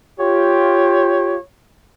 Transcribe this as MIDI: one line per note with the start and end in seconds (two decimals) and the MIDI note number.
0.19 1.35 65
0.19 1.35 67
0.19 1.41 73